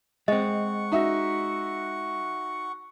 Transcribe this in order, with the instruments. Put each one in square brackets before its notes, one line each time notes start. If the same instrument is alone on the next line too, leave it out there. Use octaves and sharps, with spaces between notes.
[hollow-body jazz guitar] G#3 C4 [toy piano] D#5 [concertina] F#5 C#6
[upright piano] D#4 F#4 E5